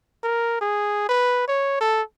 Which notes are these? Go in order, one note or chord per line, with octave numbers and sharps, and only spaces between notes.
A#4
G#4
B4
C#5
A4